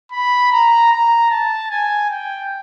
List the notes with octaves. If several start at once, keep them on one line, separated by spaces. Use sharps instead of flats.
B5
A#5
A#5
A5
G#5
G5